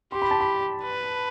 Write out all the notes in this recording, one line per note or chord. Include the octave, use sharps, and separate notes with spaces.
G4 C6
B5
A5
B5
B4